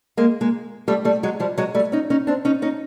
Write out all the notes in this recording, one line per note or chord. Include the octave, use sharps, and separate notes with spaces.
G#3 A#3
G#3 A#3
G3 A3
G3 A3
F#3 G#3
F3 G3
F#3 G#3
G3 A3
C#4 D#4
C#4 D#4
C4 D4
C#4 D#4
C#4 D#4